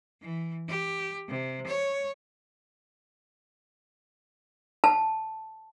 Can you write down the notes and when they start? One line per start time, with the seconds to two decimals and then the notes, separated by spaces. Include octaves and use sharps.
0.22 E3
0.68 G4
1.28 C3
1.67 C#5
4.84 A5